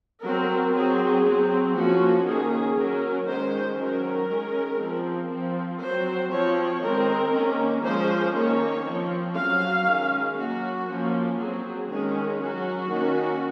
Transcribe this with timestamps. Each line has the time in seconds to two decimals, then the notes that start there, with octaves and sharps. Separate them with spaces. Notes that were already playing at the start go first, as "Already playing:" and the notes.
0.24 F#3 C4 A#4
0.74 F#3 C4 G#4
1.25 F#3 C4
1.76 F3 A#3 C#4 F#4
2.26 D#3 A#3 C#4 G#4
2.77 F#3 C#4 A#4
3.27 D#3 G#3 C#4 C5
3.79 D#3 F#3 C#4 A#4
4.29 D#3 G#3 C#4
4.80 F3 C4
5.30 F3 C4
5.81 F#3 C4 C5
6.32 F3 C4 C#5
6.82 D#3 G#3 C4 A#4
7.33 D#3 A#3 C#4
7.84 F3 G#3 C#4 C5
8.34 D#3 A#3 C#4 C#5
8.85 F3 C4
9.36 F#3 C#4 F5
9.86 D#3 G#3 C#4
10.37 F#3 A#3 C#4 F#4
10.88 F3 A#3 C#4
11.39 F#3 C4 G#4
11.89 D#3 G#3 C#4 G#4
12.40 F#3 C#4 F#4
12.90 D#3 A#3 C#4